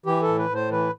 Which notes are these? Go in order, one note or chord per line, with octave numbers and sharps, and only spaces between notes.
E3 G4
A4
A2
B4
A2
C5
E3 B4